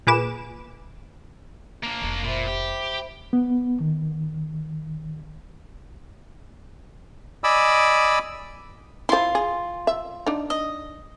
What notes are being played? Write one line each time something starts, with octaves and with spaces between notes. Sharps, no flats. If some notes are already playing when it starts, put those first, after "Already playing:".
A#2 G#4 B4 D6 E7
A#3 D4
F1 C2
A#2 C5 E5 B5
G4
B3
D#3
D5 D#5 G#5 B5 D6 E6
E4 F4 C5 C6
G#4
E5
D4 D#4
D#5